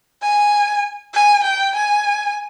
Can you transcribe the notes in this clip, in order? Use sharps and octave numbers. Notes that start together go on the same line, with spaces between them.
G#5
G#5
G5
G#5